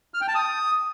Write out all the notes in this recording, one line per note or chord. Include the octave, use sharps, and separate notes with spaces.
F6
G5
A5
D#6